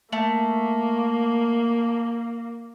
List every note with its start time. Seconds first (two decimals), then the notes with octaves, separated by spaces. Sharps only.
0.12 A3 A#3